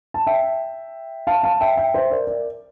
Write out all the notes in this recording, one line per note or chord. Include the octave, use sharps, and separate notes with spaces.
A5
E5 G5
F5 A5
F5 A5
E5 G5
E5 G5
C5 E5
A#4 D5
A#4 D5